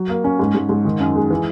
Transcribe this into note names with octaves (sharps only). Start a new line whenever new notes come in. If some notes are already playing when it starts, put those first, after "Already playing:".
Already playing: F#3
A#3
C#4
G#2
G#2
G#2
D#3
F#2
G#3
E3